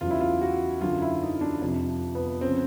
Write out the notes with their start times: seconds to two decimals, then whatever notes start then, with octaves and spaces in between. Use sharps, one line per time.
0.01 E2 C#3 F#3 F4
0.11 E4
0.21 F4
0.41 F#4
0.81 F#2 D3 F#3 F4
1.02 E4
1.22 D#4
1.41 D4
1.62 F2 C3 F3
2.15 B3
2.41 C#3 F3 C4